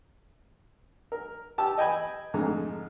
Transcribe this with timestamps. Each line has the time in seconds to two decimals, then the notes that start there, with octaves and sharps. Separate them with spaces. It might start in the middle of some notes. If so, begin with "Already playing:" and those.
1.12 A#4
1.58 G4 A5 E6
1.78 D#5 G5 G#5 B5
2.34 F2 G#2 D3 A3 A#5